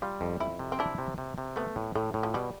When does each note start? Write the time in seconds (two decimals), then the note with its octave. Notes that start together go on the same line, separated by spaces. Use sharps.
0.02 G3 F4
0.21 F2
0.40 F2 E4
0.59 C3
0.72 C4
0.79 D4 E4
0.98 C3
1.18 C3
1.38 C3
1.56 A3 B3
1.76 A2
1.95 A2 A3
2.14 A2
2.23 F3
2.34 B2 G3